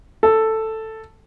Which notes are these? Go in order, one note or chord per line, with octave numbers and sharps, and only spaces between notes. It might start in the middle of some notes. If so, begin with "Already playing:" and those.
A4